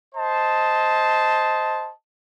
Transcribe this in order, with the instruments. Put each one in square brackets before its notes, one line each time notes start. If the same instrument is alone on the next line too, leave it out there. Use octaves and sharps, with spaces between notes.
[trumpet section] C5 D#5 A5